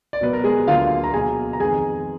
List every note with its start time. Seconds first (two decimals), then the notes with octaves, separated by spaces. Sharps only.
0.13 D5
0.21 B2 F#3 B3 B4
0.33 A#4
0.44 G#3 G#4
0.67 D2 D3 F#3 A#3 F4 F5
1.04 A#5
1.14 B2 F#3 A#3 G#4 G#5
1.53 A#5
1.60 F2 D#3 G#3 B3 G#4 G#5